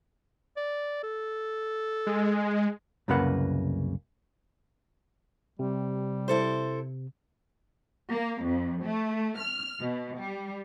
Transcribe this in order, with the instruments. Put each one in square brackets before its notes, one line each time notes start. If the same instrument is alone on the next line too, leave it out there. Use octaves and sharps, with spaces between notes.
[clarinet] D5
A4
[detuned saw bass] G#3
[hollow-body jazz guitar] C2 F#2 C#3 A#3 B4 F#5
[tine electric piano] C3 [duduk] G3
[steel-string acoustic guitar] E4 A4 C5
[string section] A#3
F2
A3
F6
B2
G3